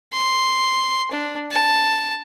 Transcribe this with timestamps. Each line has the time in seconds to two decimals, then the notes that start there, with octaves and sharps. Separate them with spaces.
0.13 C6
1.11 D4
1.51 A5